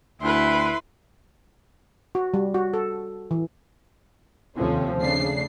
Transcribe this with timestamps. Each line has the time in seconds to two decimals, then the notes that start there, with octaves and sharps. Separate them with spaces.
0.22 D2 E4 B4 C6
2.15 F#4
2.34 G3
2.54 F#4
2.74 A4
3.31 E3
4.57 D#2 C3 F3 A3 C4 C#4
4.99 C#3 A3 D4 C7